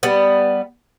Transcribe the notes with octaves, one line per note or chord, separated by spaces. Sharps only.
G3 B3